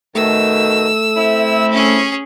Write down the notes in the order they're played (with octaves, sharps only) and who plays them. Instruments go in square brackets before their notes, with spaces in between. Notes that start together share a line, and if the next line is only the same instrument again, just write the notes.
[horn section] B2 D#3 [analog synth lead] A3 [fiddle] E6
[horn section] C4 E4
[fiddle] C#4 G#4